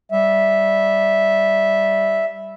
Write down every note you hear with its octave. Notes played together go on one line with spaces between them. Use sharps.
G3 E5